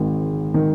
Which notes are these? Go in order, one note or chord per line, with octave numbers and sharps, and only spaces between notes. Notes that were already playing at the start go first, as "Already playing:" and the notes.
Already playing: G#1 G#2 D#3
D#3